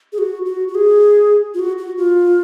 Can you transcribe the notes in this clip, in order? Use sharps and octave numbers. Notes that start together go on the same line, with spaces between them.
G#4
F#4
F#4
F#4
G#4
F4
F#4
F#4
F4